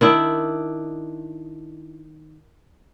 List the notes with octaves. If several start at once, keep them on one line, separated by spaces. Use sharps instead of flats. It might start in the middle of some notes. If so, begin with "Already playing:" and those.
D#3 D4 E4